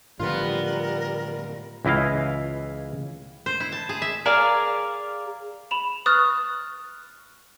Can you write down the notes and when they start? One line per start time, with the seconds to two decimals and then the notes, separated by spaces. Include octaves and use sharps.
0.19 A2 D3 F3 G3 B3 F4 A#4
1.85 C#2 E3 E4 D#5 F5
3.46 C5
3.60 E4
3.72 A5
3.89 G#4
4.02 E5
4.26 G#4 A#4 D5 F5
5.71 B5 E7 F7
6.06 B4 C#6 D#6 F6 F#6 A6